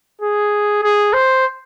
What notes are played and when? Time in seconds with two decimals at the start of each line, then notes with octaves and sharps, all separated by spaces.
0.21 G#4
0.83 G#4
1.13 C5